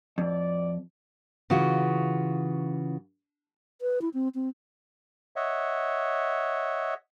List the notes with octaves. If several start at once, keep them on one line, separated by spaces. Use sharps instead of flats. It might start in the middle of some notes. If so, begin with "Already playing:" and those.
F2 A2 D5
C#3 E3 F4 F#4
B4
E4
C4
C4
C#5 D#5 E5 F#5